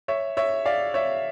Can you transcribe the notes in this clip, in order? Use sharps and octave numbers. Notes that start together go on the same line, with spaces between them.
C#5 E5
C#5 E5
D5 F5
C#5 E5